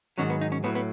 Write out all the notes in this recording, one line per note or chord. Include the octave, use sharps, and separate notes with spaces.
G#2 D#3 F#3 C#4
B3
D#4
C#4
A2 F#3 B3
B3